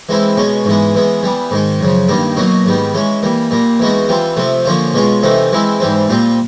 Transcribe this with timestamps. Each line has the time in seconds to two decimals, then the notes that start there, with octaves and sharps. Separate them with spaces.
0.09 E3 G#3 C4 E4
0.37 B2 G#3 C#4
0.65 G#2 E3 G#3 B3
0.95 E3 G#3 B3
1.23 E3 G3 B3
1.51 G#2 D#3 G#3
1.80 F#2 C#3 F3
2.08 G2 D#3 G3 A#3 D4
2.37 B2 F#3 A#3 D#4 F#4
2.66 G#2 D#3 G3 B3
2.94 E3 G#3 C#4
3.23 E3 G3 A#3
3.51 A#2 G3 A#3
3.80 E3 G#3 B3 D#4 F#4
4.08 E3 G3 C4 F4
4.37 C3 F3 A3 C4
4.65 D3 F3 A#3 C#4 F4
4.94 B2 G#3 C#4 F4
5.23 C3 E3 A3 C4 D#4
5.52 E3 G#3 C4 E4
5.80 G#2 E3 G3 C4
6.09 A#2 G3 C4 F4